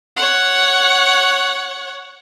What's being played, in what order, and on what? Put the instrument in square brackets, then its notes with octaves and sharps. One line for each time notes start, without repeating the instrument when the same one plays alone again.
[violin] C#5 F#5